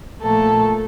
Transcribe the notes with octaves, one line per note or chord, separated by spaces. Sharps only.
A#2 F3 A3 A#3 A4